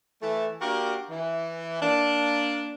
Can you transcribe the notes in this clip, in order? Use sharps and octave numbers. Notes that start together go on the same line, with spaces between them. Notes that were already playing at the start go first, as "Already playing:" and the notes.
E3 A3
A#3 D4 F#4 G4 A#4
E3
A#3 D4